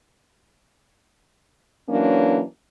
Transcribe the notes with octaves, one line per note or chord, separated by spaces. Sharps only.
E3 F#3 A#3 C#4 D4